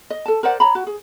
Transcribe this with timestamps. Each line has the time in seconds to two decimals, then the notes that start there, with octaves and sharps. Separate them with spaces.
0.10 D#5
0.26 A4 A5
0.43 A#4 C5 D5 F#5
0.60 C#5 A#5 B5
0.75 F#4
0.87 G#4